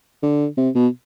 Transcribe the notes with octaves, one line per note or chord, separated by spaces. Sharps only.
D3
C3
B2